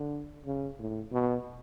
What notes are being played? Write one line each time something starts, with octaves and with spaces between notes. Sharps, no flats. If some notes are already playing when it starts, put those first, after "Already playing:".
Already playing: D3
C#3
A2
B2